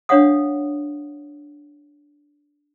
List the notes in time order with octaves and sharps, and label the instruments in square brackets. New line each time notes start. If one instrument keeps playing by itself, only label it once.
[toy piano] D4 C#5 F5 F#5 D#6